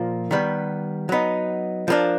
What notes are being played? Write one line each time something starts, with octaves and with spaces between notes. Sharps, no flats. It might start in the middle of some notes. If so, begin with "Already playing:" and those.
Already playing: A#2 F3 A#3
D#3 G3 B3
F#3 B3 D#4
F3 A#3 D4